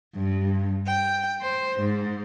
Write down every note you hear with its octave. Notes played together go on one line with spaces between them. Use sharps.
G2
G5
C5
G#2